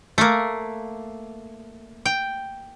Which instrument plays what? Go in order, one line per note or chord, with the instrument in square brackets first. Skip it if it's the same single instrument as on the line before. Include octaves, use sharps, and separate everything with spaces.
[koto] A3 A#3
G5